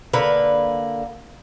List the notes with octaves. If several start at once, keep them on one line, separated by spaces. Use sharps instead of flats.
D3 A#3 B4